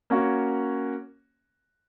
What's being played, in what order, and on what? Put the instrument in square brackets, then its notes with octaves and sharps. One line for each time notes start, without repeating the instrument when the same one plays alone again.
[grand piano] A#3 C#4 F#4 C#5